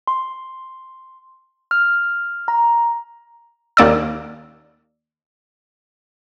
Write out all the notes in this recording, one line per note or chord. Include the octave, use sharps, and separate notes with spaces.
C6
F6
A#5
D#2 A#3 D5 E6